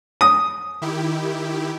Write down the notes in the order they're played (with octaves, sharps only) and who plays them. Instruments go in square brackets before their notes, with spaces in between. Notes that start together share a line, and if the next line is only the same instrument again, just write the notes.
[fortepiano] D#6
[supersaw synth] D#3 E4 G4